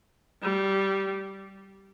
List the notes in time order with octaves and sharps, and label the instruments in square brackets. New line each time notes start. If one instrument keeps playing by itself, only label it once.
[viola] G3